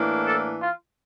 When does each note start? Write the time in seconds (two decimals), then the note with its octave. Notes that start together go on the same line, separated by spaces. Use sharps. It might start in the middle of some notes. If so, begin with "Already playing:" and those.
Already playing: A2 E3 A#3 D4
0.27 A4
0.61 F4